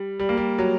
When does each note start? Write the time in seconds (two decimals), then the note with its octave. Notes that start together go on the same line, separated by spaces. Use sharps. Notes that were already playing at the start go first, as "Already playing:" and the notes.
Already playing: G3
0.20 G3
0.29 A#3
0.37 G3
0.59 F#3